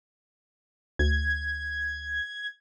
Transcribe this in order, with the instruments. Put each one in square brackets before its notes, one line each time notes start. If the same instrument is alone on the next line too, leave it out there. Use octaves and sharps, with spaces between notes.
[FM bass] D2 [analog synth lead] G#6